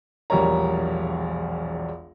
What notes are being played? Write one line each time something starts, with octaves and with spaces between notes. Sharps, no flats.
E1 A#1 G3 A#4 C#5 A#5